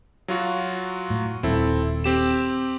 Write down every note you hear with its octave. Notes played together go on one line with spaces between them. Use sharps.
F#3 F4 F#4
A2
D#1 C4 E4 A4
C4 G4 E7